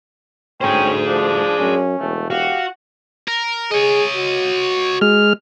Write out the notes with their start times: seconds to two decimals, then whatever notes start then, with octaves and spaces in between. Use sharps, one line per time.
0.61 D2 C#4 G#4 C5 G5
1.07 F3 D4
1.59 F#2 C#4
2.00 E1 A3
2.30 F#4 G4 F5
3.28 A#4
3.71 G#4 C#5 D#5
4.16 F#4
5.01 G#3 F6